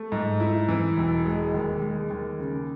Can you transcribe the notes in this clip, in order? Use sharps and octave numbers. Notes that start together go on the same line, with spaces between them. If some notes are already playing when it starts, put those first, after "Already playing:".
Already playing: A3
G#2
E4
E3
E1
G#3
D#2
G#3
D#2
C#3